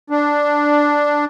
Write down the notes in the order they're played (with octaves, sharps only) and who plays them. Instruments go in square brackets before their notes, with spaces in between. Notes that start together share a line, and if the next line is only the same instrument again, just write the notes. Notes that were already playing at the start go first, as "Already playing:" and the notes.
[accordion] D4